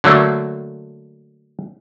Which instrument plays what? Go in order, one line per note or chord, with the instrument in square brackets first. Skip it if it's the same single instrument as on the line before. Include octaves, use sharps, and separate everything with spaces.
[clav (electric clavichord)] D3 F#3 A3 A#3